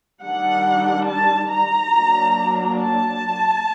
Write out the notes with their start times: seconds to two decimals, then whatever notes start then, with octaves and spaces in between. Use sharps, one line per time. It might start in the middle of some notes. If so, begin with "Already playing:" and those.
0.22 D#3 G3 D4 F#5
1.07 A5
1.50 A#5
1.93 F#3 A#3 D4
2.79 A5